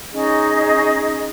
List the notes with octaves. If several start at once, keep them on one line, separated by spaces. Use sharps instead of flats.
C#4 D#4 G#4 D#5